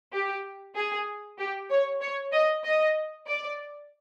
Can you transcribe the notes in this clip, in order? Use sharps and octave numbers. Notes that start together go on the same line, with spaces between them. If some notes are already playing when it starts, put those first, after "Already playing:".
G4
G#4
G4
C#5
C#5
D#5
D#5
D5